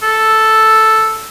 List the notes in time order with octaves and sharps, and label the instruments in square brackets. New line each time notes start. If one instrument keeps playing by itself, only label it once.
[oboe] A4